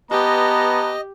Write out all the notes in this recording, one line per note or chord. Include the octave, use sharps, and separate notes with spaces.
B3 G4 B4 D#5 A5 A#5